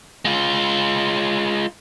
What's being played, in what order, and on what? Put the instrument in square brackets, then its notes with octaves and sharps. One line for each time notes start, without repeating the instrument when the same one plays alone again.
[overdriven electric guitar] G#3 F4